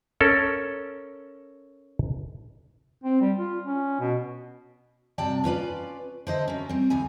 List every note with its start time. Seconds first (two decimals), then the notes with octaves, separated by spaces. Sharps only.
0.21 C#4 A4 A#4
3.04 C4
3.21 G3
3.38 F4
3.66 C#4
4.00 B2
5.18 G2 C3 F#4 D5 G5 A5
5.44 C#4 F4 B4 D5
6.27 D3 C5 D#5 E5
6.48 F#3 C#4
6.69 G3 C4
6.90 D2 D#3 E3 G#5